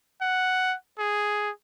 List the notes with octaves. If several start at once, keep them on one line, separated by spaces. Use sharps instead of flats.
F#5
G#4